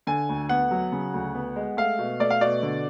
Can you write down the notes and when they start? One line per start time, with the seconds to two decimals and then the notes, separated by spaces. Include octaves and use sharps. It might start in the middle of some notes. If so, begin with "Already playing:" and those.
0.07 D3 G#5
0.29 D2
0.49 B3 F#5
0.71 F#3
0.92 C#3
1.14 D2
1.35 B3
1.56 G#3
1.77 A3 F5
1.99 B2
2.20 A3 D5
2.30 F5
2.41 B2 D5
2.62 D3